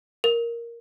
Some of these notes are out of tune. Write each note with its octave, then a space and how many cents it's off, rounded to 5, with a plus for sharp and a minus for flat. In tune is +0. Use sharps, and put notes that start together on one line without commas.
A#4 +5